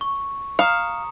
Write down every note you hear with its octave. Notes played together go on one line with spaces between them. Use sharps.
C#6
F5 A#5 D#6 C#7